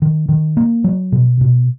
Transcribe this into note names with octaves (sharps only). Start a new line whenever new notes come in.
D#3
D#3
A#3
F#3
B2
B2